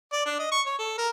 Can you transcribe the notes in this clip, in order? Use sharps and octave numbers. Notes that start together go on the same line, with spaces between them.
D5
D4
D#5
C#6
C#5
A4
A#4